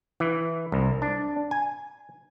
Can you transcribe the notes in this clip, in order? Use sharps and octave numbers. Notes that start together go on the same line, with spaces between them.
E3
C2
D4
G#5